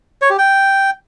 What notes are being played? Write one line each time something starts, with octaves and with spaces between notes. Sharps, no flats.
C#5
G4
G5